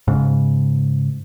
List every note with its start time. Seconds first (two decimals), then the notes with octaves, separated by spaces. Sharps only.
0.08 G#2 C#3